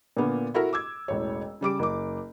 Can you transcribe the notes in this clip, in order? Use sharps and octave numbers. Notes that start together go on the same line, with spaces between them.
A#2 D3 A#3 B3
E4 F#4 A4 A#4
D6 E6 G#6
E1 A1 C#5
C#3 G3 D6 D7
F#1 D6